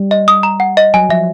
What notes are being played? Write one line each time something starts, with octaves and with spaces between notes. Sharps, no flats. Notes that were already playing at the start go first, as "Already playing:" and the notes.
Already playing: G3
D#5
D#6
A#5
F#5
D#5
F#3 G#5
F3 E5